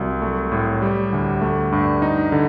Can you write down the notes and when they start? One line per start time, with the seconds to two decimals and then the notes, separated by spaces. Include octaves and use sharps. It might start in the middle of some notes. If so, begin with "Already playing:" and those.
Already playing: C2 F#3
0.22 A3
0.52 A2
0.82 G3
1.13 D2
1.41 A3
1.72 G2
2.02 D#4
2.32 D3